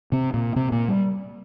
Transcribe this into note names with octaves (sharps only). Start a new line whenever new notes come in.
C3 C4
A#2 A#3
C3 C4
A#2 A#3
G3